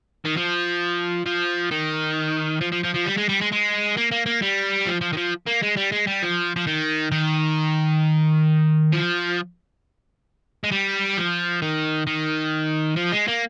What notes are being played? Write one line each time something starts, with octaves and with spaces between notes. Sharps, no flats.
D#3
F3
F3
D#3
F3
F3
F3
F3
G3
G#3
G3
G#3
G#3
A#3
A#3
A#3
G3
F3
F3
D#3
F3
A#3
G#3
G3
G#3
G3
F3
F3
D#3
D#3
F3
G#3
G3
F3
D#3
D#3
F3
G#3
A#3